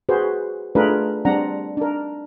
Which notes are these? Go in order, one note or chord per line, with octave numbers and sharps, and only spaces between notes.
F#4 G#4 B4 C5
A3 D4 F4 G#4 A#4 B4
G3 C4 D4 F#5 A#5
D4 A#4